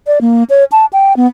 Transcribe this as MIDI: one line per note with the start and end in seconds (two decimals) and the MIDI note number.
0.07 0.19 74
0.21 0.44 58
0.50 0.64 73
0.72 0.86 81
0.93 1.16 79
1.17 1.27 59